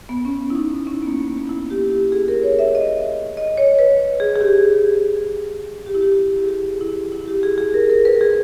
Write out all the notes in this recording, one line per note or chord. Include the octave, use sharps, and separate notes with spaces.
B3
C#4
E4
D#4
C#4
B3
A#3
A#3
B3
E4
G4
G4
G#4
A#4
C#5
E5
D#5
D#5
C#5
B4
G#4
G#4
G4
G4
E4
G4
G#4
G4
E4
E4
G4
G#4
G#4
A#4
A#4
B4
G#4